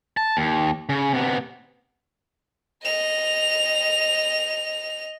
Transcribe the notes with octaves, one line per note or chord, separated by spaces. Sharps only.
A5
D#2
C#3
C3 B3
D#5 F7